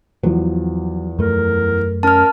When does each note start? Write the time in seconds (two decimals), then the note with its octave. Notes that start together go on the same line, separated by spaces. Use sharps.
0.23 E2 F3 F#3
1.19 F#2 A3 A#4
2.03 C#4 A#4 A5 F6